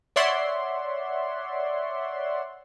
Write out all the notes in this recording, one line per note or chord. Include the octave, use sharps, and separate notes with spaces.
C#5 D5 E5 F#5 C6